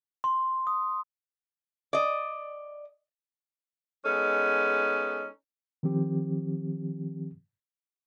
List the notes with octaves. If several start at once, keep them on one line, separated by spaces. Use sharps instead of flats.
C6
D#6
D5 D#5
G#3 B3 C#4 D#4 A4
D#3 F3 C4 G4